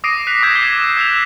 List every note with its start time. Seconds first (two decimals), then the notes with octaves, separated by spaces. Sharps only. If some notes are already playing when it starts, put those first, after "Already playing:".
0.04 D6 D#6 A#6 C7 D7 D#7
0.27 F#6 B6 F7
0.43 D6 E6 G6 G#6 A#6 E7
0.56 G7
0.97 E6 F#6 E7 F7